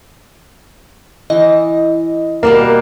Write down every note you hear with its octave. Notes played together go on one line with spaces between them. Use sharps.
E3 D#5
B2 G3 A#3 A#4 A5